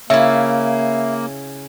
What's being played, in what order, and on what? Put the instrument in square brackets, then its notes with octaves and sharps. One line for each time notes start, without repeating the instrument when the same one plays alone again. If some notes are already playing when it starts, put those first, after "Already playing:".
[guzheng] C#3 E4 [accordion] A#3 [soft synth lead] E5